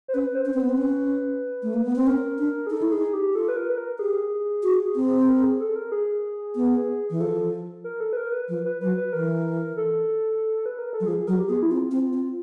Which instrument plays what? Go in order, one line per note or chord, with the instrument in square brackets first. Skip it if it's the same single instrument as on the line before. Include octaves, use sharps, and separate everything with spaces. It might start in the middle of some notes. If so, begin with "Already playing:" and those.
[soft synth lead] C5
[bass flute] C#4 [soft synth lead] B4
[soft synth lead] C5
[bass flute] C#4
C4
[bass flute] B3 [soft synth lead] B4
[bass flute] C4
C#4
A3
A#3
B3
C4
[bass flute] C#4 [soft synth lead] A#4
[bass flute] D4
[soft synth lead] G#4
[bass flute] D#4 [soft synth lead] A4
[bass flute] E4
[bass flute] D#4 [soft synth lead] G#4
[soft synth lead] G4
[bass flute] F4 [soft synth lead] A4
[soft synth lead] B4
A#4
B4
A#4
[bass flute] G4 [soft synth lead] G#4
[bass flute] F#4
C4
[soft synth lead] A#4
G#4
A4
A#4
G#4
[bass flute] B3
E3
[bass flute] F3 [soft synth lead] A4
[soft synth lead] A#4
A4
B4
A#4
B4
[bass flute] F3
[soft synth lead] B4
[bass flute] F#3 [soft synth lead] B4
[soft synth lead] B4
[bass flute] E3 [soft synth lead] A#4
[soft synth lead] A4
B4
A#4
A4
[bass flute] F#3
[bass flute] F3 [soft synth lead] G#4
[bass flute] F#3 [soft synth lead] A#4
[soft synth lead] G4
[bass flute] B3 [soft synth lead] G#4
[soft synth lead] E4
[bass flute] C4 [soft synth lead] F4
[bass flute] C4
C4